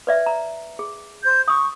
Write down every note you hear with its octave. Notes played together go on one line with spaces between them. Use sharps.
B4 D5 E5
A#5
G#4
C5 G6
C#6 D#6 E6